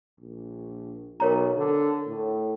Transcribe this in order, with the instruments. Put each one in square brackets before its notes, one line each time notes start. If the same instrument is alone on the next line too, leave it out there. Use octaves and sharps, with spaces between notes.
[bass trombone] A#1
[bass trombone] B1 [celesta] A#4 C#5 A#5
[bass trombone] D3
A2